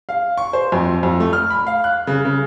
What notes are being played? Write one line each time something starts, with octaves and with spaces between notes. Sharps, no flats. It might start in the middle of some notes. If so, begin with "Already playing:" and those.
F5
C#6
C5
F2
F2
A3
F6
B5
F5
F#6
C#3
C#3